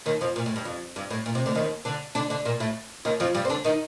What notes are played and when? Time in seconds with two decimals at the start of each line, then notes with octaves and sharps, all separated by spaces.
0.06 D#2 D#3
0.21 F2 F3
0.36 A#2
0.46 A2
0.56 G2
0.65 F2
0.96 G2
1.10 A2
1.26 A#2
1.35 C3
1.46 D2 D3
1.55 D#2 D#3
1.85 D3 D4
2.15 D3 D4
2.30 D3 D4
2.45 A#2 A#3
2.60 A2 A3
3.05 D#2 D#3
3.20 F2 F3
3.35 G2 G3
3.45 C4
3.50 D3 D4
3.65 D#3 D#4